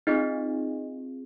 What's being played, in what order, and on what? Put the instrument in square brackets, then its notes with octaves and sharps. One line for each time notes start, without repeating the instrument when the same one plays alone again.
[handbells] C4 D#4 F4 G#4 D#5